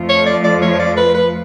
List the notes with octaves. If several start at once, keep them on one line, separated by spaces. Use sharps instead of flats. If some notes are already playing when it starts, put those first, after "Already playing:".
Already playing: F2 F3 A3 F4
C#5
D5
D5
C#5
D5
B4
B4